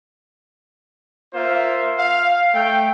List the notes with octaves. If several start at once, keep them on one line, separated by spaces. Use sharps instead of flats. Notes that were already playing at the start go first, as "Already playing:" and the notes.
A#3 F4 C5 E5
F5
A3 G5